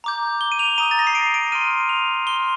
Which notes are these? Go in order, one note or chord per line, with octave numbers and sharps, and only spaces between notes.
A#5 D6 G6
G7
D#7
F7
A#5 D#6 G6 D#7
A6
A#6
C7
D7
D7
C6 F6 D#7
F7
C6 F6 G7